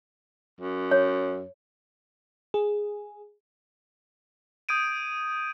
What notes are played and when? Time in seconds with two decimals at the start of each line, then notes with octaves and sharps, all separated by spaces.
0.61 F#2
0.91 C#5
2.54 G#4
4.69 D#6 G6 G#6 D7 D#7